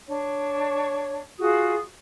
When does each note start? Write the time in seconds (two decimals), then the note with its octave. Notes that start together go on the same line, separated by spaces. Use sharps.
0.07 D4 C#5
1.39 F4 F#4 G#4 D#6